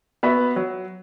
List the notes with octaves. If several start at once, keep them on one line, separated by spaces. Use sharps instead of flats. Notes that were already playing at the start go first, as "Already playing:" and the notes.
B3 F#4 B4 E5
F#3